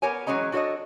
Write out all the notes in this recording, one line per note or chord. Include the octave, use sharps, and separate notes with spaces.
B3 G4 A#4 C#5 G#5
E3 F#3 G#3 C#4 D#5 A#5
D4 F#4 A4 C5 C#5 D#5